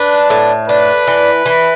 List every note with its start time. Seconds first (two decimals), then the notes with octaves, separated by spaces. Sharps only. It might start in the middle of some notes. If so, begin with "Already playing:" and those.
Already playing: D4 B4
0.30 A2
0.68 D4 B4
1.07 E3
1.46 E3